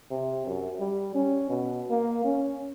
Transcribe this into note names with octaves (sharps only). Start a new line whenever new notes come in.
C3
F#2
G3
C#4
B2
A#3
C#4